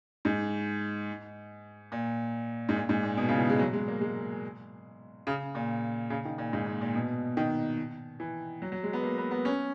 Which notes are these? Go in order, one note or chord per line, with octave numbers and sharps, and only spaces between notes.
G#2
A#2
G#2
A#2
G#2
A#2
B2
C#3
E3
G#3
F#3
G#3
A#3
G#3
C#3
A#2
C#3
D#3
A#2
G#2
A#2
A#2
B2
D#3
E3
F#3
F#3
G#3
B3
A#3
B3
B3
C#4